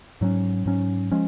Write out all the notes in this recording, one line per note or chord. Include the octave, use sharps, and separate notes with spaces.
G#2 F#3 C#4
G#2 F#3 C#4
F3 G#3 C#4